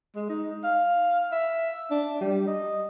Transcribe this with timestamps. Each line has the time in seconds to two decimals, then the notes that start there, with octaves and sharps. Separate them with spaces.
0.16 G#3
0.30 D#4
0.64 F5
1.32 E5
1.91 D4
2.21 G3
2.48 D#5